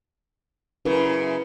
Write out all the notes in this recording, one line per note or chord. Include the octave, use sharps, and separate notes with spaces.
F#2 C#3 E4 A#4 B4